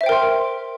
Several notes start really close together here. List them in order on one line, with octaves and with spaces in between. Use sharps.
E5 C5 G5 A#4 C6